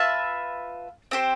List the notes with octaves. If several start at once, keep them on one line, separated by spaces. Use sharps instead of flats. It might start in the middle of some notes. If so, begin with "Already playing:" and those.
Already playing: F4 B4 E5 A5
C4 G4 C5